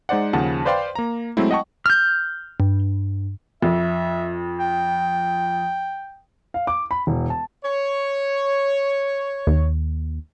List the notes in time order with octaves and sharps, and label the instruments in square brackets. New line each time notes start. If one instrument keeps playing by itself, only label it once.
[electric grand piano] G#3 D#4 C5 D5 F#5
D#2 C#3 F3 F#5 A5
B4 C5 D5 F5 G5 C6
A#3 A#5
F#3 G#3 A3 C4 E4
D#5 F#5 G5 A5 C#6
[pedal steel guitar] F6 G6
[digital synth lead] G2
[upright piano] F2 [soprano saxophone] E5
[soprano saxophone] G5
[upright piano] F5
D6
B5
E1
A5
[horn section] C#5
[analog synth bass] D#2